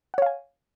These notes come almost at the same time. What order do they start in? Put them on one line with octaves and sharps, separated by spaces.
F#5 C#5 F5 G#5